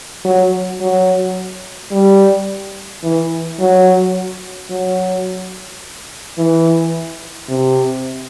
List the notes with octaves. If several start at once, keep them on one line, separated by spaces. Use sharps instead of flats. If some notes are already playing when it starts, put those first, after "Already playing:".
F#3
F#3
G3
E3
F#3
F#3
E3
C3